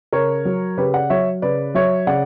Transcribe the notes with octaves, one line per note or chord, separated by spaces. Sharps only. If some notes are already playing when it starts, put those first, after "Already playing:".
C#3 A#4 C#5
F#3
C#3 G4 B4
D5 F#5
F#3 C#5 E5
C#3 B4 D5
F#3 C#5 E5
C#3 D5 F#5